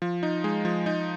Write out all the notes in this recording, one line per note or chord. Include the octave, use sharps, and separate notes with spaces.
F3
D#4
G#3
F3
D#4